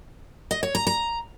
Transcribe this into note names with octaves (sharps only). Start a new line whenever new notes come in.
D#5
C#5
A#5
A#5